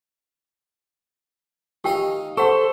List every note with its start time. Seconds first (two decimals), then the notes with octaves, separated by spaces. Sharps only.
1.84 D#3 G4 A#4 D#5 F5 G5
2.37 A4 C5 F#5 C#6